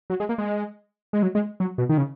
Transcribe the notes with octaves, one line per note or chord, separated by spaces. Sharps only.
F#3
G#3
A#3
G#3
G#3
F#3
G#3
F#3
B2
D#3
C#3